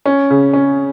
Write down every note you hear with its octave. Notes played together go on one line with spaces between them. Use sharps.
C#4
C#3
C#4